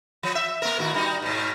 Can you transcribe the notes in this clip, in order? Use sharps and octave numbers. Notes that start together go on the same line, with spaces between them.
F3
E5
A#3 B3 A#4
A2 D#3 F#4
G3 D#4 F#4
G#2 B2